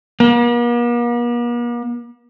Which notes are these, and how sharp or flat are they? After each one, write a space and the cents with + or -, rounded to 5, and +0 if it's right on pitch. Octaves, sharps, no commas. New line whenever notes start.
A#3 +45